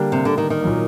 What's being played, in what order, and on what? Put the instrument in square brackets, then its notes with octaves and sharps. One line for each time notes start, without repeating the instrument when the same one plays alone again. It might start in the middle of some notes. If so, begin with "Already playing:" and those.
Already playing: [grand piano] D3 G3 A#3 D4 G4
[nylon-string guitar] C3
D3
D#3
D#3
[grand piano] A#2 F#3 A#3